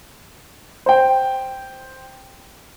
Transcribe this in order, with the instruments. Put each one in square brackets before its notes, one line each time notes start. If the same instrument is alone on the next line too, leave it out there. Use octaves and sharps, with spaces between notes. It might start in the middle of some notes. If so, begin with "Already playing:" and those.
[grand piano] C5 G5